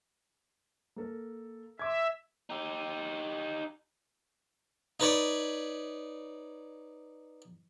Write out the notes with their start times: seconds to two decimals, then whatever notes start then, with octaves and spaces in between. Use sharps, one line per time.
0.96 A#3 A4 A#4
1.79 E5 C6 D6 G#6
2.50 D#4 G4
5.00 D#4 B4 C#5 D5